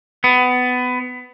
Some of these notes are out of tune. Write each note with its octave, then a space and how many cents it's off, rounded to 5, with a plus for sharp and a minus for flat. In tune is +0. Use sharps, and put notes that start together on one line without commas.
B3 +20